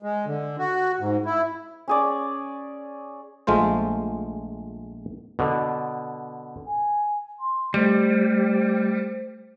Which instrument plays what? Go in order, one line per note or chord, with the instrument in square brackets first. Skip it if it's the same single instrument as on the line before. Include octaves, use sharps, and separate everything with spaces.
[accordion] G#3
D3
F#4
G#2
E4
[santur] C#4 G#4 D5
[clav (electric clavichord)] A#1 G#3 A3 F4 C5
B2 D3
[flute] G#5
C6
[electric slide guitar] G3 [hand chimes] A3 [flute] C5